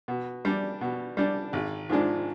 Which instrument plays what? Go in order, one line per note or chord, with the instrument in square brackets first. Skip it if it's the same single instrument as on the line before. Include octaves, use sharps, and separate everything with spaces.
[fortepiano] B2
G3 D4
B2
G3 D4
G#1
G#2 F3 G#3 D4